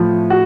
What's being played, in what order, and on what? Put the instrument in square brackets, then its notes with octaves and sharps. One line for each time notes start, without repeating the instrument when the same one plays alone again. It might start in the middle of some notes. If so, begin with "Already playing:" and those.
Already playing: [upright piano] A2 A3 [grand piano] F3
[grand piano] F#4